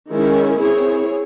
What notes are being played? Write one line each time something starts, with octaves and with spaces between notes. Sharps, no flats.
D#3 G#3 C#4 E4
C4 E4 G#4 C#5